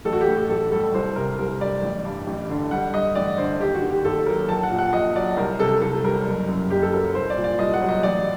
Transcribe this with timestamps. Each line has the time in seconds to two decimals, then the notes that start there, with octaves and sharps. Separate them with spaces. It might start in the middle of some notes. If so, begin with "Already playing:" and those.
0.05 A1 A4
0.13 F#4
0.21 G4
0.28 A2
0.36 G4
0.50 A1 A4
0.72 G3 A4
0.94 C2 C5
1.16 C3 A#4
1.39 C2 A#4
1.60 G3 D5
1.83 A1
2.05 G2
2.27 A1
2.49 D3
2.71 G3 F#5
2.93 G2 D#5
3.15 A1 D5
3.38 D3 C5
3.61 D#2 G4
3.75 F#4
3.82 D#3
3.90 G4
4.05 D#2 A4
4.26 F#3 A#4
4.49 A#1 A5
4.63 F#5
4.71 A#2
4.78 F#5
4.93 A#1 D#5
5.15 F#3 D5
5.37 C2 A#4
5.59 C3 A4
5.81 C2 A4
6.04 G3 A#4
6.27 F#1
6.48 F#2
6.70 F#1 G4
6.82 A4
6.92 F#3 A#4
7.14 C2 C5
7.30 D5
7.37 A#2
7.44 D5
7.59 C2 D#5
7.74 F#5
7.81 F#3
7.89 D#5
8.03 A1 D5